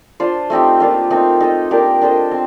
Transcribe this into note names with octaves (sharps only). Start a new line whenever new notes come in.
D4 F4 C5
A3 C4 D#4 G4
A#3 D4 F4
A3 C4 D#4
D#4 A4 D#5
A#3 D4 G4 A#4
D4 A4 C5 D#5
C4